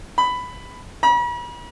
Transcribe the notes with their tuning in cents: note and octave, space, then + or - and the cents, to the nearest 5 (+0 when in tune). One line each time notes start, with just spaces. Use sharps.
B5 +10
B5 -45